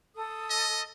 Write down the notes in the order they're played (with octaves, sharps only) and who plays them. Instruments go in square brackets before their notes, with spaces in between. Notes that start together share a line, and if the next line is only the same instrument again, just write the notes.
[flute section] A4 D#6
[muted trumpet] D#5